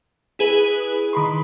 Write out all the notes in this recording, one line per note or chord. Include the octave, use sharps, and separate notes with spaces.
E4 G#4 B4
D#3 B5 C6